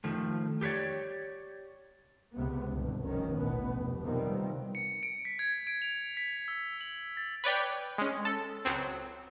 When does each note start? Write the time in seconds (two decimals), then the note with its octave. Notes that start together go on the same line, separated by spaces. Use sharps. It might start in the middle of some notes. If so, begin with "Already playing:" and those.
0.04 D#3 F3 A3
0.61 G4 A4 B4 C#5 D5
2.34 C#2 C3 B3
2.70 G1 C2 B2
3.03 F1 D#3 C#4
3.36 A1 D2 B2 B3
3.70 F1
4.04 C3 D#3 F3 G3 B3 C4
4.75 C#7
5.03 D7
5.25 B6
5.39 G#6
5.67 D7
5.82 F7
6.17 B6
6.48 E6
6.81 F#7
7.17 A6
7.44 B4 C#5 D5 G5
7.98 G#3 C#4
8.25 A4
8.65 C#2 F#3 C4